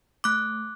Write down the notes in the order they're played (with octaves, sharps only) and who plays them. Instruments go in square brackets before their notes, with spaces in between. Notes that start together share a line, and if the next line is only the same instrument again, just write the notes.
[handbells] A3 D6 F#6